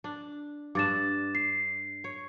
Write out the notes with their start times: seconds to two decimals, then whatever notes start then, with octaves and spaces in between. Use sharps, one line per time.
0.04 D4
0.75 G2 D4 D6 A6 E7
1.35 C7
2.04 C#5